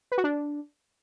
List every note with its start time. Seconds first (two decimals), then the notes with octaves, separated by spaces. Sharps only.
0.12 B4
0.18 F#4
0.24 D4